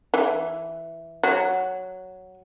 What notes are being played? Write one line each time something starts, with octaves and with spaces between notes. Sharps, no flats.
E3
F#3